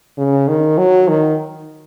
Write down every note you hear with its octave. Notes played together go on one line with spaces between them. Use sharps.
C#3
D#3
F#3
D#3